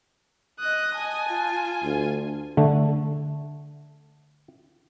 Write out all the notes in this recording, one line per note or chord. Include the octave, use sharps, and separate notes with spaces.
D#5 D#6 F#6
G#5 A5
F4
D2
D3 A3